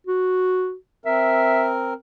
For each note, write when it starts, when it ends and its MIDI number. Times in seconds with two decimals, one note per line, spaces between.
0.07 0.75 66
1.05 1.93 60
1.05 1.93 70
1.05 1.69 76